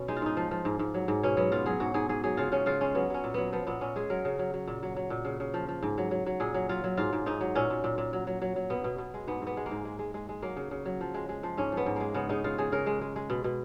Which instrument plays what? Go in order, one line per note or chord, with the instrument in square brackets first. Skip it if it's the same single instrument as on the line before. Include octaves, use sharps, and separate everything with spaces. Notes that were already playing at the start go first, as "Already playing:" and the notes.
Already playing: [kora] B2 C#4
G#3 D#4
F4
G#2 D#4
F3
F3
G#2
G#2
F#3
G#2
B2 C#4
F#3 B3
B2 F4
F#3 G#4
G#2 F#4
G#2 G#4
G#2 G#4
F#3 G#4
C#3 F4
C#3 C#4
C#3 F4
G#3 C#4
F#3 B3
F#3 C#4
A#2
F#3 B3
F3 B3
A#2 B3
A#2 C#4
G#3 G#4
F#3 A#4
C#3
F#3
F#3
A#2
F#3
F#3
A#2
C#3
C#3
F3
F3
G#2
F#3
F#3
F#3
A#2 G#4
F#3
F#3 F4
F#3
G#2 F4
G#2
G#2 D#4
F#3
A#2 C#4
A#2
A#2
A#2
F#3
F#3
F#3
F#3
B2 B3
B2
B2
G#3
G#2 B3
G#2 B3
G#3
A#3
G#2
G#3
G#3
G#3
G#3
F#3 A#3
C#3
C#3
F#3
F3
G#3
G#3
F3
G#2 C#4
F3
B3
G#2
G#3 A#3
C#3 B3
C#3 D#4
C#3 F4
C#3 G#4
C#3 A#4
G#3
G#3
G#3
B2
B2